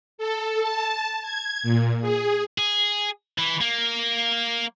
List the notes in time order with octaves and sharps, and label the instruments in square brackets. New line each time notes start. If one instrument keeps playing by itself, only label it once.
[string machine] A4
A5
G#6
A#2
G#4
[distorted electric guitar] G#4
E3
A#3